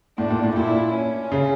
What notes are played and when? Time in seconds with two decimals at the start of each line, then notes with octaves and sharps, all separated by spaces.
0.18 A2 D4
0.30 A#2
0.43 A2
0.56 A#2 E4
0.94 C#4
1.32 C#3